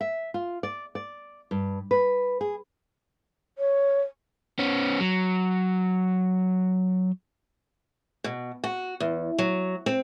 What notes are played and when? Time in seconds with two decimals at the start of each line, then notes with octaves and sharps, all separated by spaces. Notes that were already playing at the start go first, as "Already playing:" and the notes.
0.01 E5
0.34 F4
0.63 D5
0.95 D5
1.51 G2
1.91 B4
2.41 G#4
3.58 C#5
4.59 B3 C#4
5.00 F#3
8.24 B2
8.64 F#4
9.00 E2
9.38 F#3
9.86 C4